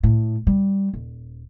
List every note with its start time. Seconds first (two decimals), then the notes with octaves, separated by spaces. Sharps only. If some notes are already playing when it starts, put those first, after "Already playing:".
0.03 A2
0.47 G3
0.93 D#1